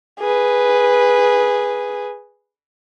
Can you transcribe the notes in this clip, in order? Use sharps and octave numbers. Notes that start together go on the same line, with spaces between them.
G#4 B4